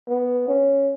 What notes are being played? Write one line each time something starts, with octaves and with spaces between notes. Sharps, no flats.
B3
C#4